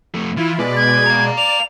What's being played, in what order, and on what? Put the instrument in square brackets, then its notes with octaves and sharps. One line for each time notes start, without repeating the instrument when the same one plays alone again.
[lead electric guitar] F2 A3
[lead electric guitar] E3 [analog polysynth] E4 F4
[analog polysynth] B2 G#3 D5 [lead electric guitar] B4
[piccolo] G#6
[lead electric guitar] F5 A#5
[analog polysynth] D5 [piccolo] F7